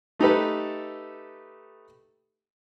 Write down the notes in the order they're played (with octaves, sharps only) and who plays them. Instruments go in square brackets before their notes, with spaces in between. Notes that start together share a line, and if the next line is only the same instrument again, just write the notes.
[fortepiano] A3 D#4 G4 A4 B4